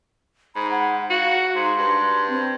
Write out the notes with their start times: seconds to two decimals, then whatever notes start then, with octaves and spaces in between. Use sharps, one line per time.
0.56 G#2 B5
0.71 F#5
1.10 F#4 F5
1.55 G#2 C6
1.78 G2
2.29 C4